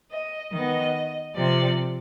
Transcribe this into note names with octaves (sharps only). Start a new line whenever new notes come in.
D#5
D#3 B3 D#5
C3 F3 C4 D5